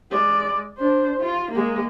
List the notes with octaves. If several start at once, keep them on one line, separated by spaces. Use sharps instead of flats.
G#3 D5
D4 C5
F4
G#3 A#3